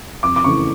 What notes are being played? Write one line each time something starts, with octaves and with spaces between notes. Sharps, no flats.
F2 D6
D6
C#3 E3 A3 C#6